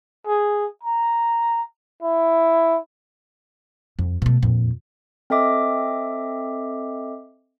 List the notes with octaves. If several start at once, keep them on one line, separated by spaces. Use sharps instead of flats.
G#4
A#5
E4
F2
B2 A3
F2 A#2
C4 A4 D#5 E5 D6